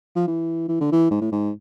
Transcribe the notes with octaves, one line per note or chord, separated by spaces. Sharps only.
F3
E3
E3
D3
E3
G#2
A2
G#2